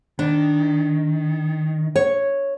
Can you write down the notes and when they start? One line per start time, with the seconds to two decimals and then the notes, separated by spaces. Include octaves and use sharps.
0.19 D#3 D4
1.96 C#5